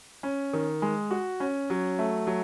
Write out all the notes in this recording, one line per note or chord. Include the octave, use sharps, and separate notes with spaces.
C#4
D#3
G#3
F#4
C#4
F#3
A3
F#3